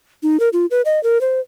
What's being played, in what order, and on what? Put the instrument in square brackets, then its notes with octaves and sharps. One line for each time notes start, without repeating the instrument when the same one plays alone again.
[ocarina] D#4
A#4
F4
B4
D#5
A#4
C5